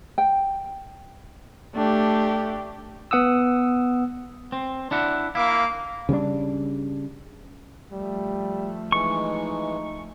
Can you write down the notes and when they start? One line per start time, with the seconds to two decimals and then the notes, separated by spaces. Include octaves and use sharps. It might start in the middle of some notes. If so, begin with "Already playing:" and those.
0.18 G5
1.75 A3 D4 G4
3.11 B3 F#5 D#6 E6
4.52 C4
4.91 D4 E4 F#5
5.35 A#3 E4 F5 D6
6.09 C#3 G3 C4 D4
7.93 F3 G3 A3
8.92 E3 G#3 D#4 C#6